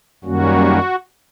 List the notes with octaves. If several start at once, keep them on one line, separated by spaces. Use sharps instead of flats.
F#2 D#3 G3 A#3 C#4 F#4